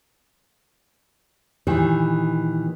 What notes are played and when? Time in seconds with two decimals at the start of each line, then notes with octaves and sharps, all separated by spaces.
1.67 A#2 D#3 E3 G4